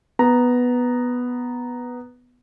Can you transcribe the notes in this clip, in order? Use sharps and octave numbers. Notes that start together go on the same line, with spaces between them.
B3 A#5